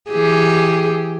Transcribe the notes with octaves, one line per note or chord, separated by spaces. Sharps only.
E3 G4 G#4